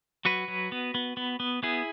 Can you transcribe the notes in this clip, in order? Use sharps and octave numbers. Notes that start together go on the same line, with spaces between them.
F#3 F#4 B4
F#3
B3
B3
B3
B3
B3 E4 G#4